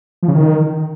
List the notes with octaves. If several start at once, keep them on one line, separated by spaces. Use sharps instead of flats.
F3
C#3
D#3